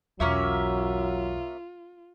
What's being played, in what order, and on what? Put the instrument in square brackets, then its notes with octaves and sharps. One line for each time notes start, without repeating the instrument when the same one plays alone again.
[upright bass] B1 E2 [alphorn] F#3 [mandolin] A#3 C#4 E5 [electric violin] F4